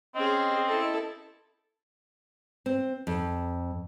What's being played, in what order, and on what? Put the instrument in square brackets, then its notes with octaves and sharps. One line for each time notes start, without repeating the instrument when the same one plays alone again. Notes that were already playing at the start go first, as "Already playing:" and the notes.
[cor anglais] C4 [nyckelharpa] C#4 G#4 [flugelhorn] D#5
[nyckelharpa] E4 A4
[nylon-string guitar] C4
F2